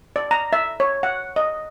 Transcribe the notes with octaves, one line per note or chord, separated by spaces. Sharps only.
D5
A#5
E5
C#5
F#5
D#5